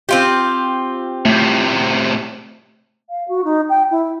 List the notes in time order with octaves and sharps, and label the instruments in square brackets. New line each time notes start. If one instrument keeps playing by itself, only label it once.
[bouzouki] C4 F4 G4
[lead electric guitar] A2 C3 [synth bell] A3
[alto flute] F5
F#4
D#4
G5
E4